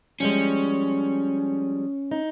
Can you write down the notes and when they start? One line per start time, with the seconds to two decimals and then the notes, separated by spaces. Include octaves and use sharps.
0.20 F3 G3 G#3 C#4
2.11 D#4